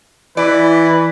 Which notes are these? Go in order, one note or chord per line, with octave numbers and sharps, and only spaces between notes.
E3 B4 D5